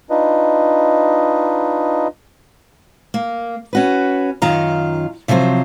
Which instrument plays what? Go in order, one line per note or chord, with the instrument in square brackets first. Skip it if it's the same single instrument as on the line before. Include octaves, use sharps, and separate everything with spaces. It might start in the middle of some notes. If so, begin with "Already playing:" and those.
[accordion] D4 D#4 F4 B4 D#5
[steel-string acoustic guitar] A#3
C#4 F#4 B4
F#2 D#3 F4 F5 A#5
C3 F3 F#3 B4 C5